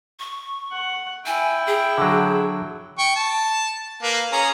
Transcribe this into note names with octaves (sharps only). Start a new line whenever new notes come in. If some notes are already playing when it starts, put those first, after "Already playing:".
C#6
F#5
E4 G5 G#5
G#4
D3 F#3
G5 C#6
A5
A#3 B4
C#4 G#4 A#5